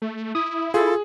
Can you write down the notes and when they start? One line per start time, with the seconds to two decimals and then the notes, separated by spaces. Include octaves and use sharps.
0.02 A3
0.35 E4 D#6
0.74 F4 G#4 A4